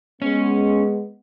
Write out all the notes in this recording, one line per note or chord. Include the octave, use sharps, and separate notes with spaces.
G#3 B3 C#4